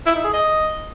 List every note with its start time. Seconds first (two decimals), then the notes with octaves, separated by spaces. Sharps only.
0.06 E4
0.15 D#4
0.24 G#4
0.33 D#5